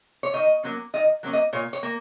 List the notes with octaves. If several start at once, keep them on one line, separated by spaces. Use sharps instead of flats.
C#5
D#3 D#5
F#3 A#3 C#4
D#3 D#5
F#3 A#3 C#4
D#5
A#2 C#5
C#5
A#3